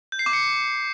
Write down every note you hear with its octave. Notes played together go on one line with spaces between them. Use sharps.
G6
C7
D6
C#7